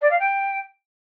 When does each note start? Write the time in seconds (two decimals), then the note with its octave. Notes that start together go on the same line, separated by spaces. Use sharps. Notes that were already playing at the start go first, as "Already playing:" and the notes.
0.01 D5
0.10 F5
0.19 G5